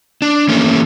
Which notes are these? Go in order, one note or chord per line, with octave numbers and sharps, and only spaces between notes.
D4
E3 A3 A#3 C#4